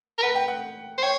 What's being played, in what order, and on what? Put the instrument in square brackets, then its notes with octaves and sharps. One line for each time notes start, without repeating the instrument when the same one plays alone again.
[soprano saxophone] A#4
[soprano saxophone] B4 [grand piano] F#5
[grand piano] G5
F#5
[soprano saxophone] C5
[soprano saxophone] C#5 [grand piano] G5